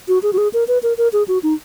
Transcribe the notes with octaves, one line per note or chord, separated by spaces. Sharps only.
F#4
G#4
F#4
G#4
A#4
B4
A#4
A#4
G#4
F#4
D#4